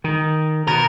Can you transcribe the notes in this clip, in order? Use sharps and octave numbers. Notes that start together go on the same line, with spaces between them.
D#3
B2 A#4